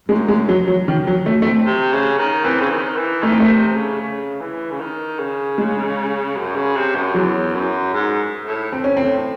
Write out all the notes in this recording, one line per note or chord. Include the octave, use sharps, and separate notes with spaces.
F#2 G#3
G#3
F#3
F#3
D#3
F#3
A3
A3
C4
C3
C#3
D#3
E3 C4
C#3
D#3
E3
D#3 A3
C4
A3
C3
C#3
C#3
E3
C#3
D#3
C#3
G#3
F#2
C#3
C3
F#2
E2 F#3
F#2
G#2
A2
C4
C#4
A2 C4